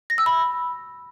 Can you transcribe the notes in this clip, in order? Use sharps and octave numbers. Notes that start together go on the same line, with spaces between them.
A#6
E6
B5